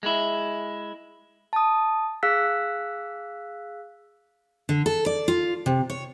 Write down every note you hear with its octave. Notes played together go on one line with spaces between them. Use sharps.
G#3 E4
A5 D#6
G#4 F5 E6 F#6 B6
D3
A4
D5
F4
C3
C#5